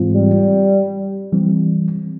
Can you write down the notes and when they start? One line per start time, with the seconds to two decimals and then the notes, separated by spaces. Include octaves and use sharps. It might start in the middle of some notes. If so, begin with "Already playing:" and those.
Already playing: G#2 E3 G#3 C4 F4
0.15 G3
1.32 E3 G3 C4